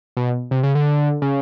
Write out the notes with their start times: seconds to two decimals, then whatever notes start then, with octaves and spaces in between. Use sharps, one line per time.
0.17 B2
0.51 C3
0.63 C#3
0.75 D3
1.22 C#3